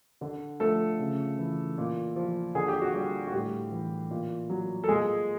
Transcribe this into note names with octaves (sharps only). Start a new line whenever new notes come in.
D3
F3 A3 A4
C#3
E3
A#2
F3
D3 G#4
G4
F#4
G3 G4
F#4
A2 G3 G4
E3
A#2
F#3
A4
A#2 G#3 G#4